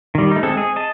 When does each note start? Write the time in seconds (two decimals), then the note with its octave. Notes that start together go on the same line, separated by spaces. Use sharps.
0.15 D#3 G3
0.31 A3 D#4
0.43 G#3 C4 A4
0.57 G#4
0.76 D#5 A5